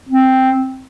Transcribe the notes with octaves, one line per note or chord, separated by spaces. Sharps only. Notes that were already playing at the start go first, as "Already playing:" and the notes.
C4